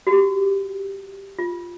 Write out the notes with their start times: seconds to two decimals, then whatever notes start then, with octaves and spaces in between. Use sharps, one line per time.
0.07 F#4
0.11 G4
1.39 F4